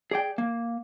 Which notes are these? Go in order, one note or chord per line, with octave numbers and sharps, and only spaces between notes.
G#4 D5 G5
A#3